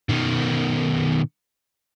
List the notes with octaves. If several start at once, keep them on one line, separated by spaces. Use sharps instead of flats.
B2 D#3